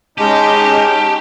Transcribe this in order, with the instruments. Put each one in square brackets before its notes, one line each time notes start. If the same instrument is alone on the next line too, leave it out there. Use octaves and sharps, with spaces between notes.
[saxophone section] G#3 [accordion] C#4 D#4 [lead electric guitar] G4 [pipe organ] A5